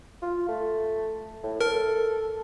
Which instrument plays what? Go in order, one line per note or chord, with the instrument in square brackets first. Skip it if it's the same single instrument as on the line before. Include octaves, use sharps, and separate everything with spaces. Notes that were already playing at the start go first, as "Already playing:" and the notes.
[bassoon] F4
A3
A2
[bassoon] A4 [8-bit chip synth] A#4